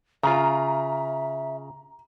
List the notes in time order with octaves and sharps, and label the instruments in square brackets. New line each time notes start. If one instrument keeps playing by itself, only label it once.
[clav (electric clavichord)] C#3 F4 [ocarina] E5 [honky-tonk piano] A#5